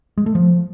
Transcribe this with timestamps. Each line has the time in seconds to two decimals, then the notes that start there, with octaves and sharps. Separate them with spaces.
0.17 G#3
0.26 A3
0.35 F3